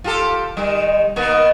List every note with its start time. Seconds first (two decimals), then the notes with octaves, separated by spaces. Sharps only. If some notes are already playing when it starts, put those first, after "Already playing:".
0.04 F4 G4 A4
0.57 D#3 G3
1.16 D#3 A#3 B3